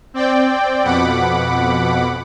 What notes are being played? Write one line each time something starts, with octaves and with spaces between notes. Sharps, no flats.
C4 D5 G5
F2 B2 F#5 B5 D6